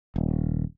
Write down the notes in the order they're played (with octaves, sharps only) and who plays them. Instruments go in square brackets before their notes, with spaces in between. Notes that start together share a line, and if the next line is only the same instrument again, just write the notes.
[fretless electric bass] D#1